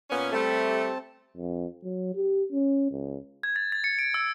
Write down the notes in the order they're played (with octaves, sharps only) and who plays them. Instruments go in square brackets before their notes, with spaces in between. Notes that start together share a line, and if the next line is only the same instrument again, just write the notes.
[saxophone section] A#2 B3 C#4
[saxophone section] G3 A3 [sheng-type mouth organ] C4 A5
[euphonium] F2
F#3
G4
C#4
C#2
[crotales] G#6
A6
A6
C#7
D7
E6